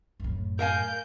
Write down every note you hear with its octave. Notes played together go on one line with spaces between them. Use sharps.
F#2 A2
A#4 F5 G#5 G6